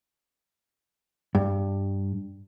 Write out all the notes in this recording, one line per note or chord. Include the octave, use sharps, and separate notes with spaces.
G2